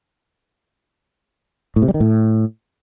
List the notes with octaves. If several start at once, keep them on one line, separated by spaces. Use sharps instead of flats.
A2
C3
G3
D#3
A2